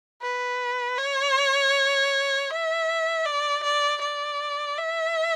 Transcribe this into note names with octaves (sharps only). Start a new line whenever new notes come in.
B4
C#5
E5
D5
D5
D5
E5